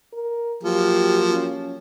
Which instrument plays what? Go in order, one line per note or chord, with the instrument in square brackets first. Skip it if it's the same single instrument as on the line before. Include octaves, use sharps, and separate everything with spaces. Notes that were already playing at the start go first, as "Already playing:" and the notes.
[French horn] A#4
[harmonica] F3 F#3 A#3 [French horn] G4
[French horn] C#4